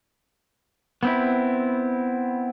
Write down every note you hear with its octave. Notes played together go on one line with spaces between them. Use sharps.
B3 C4 E4